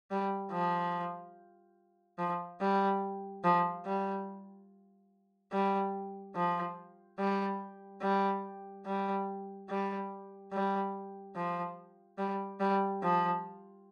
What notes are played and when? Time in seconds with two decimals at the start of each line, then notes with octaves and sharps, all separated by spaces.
0.11 G3
0.52 F3
2.18 F3
2.61 G3
3.44 F3
3.86 G3
5.52 G3
6.35 F3
7.19 G3
8.02 G3
8.86 G3
9.69 G3
10.52 G3
11.35 F3
12.18 G3
12.60 G3
13.02 F3